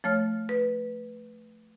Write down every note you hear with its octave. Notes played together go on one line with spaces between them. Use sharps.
F3 A3 C#5 F6
B4